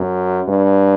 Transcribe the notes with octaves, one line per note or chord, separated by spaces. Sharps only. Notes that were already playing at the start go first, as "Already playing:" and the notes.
Already playing: F#2
G2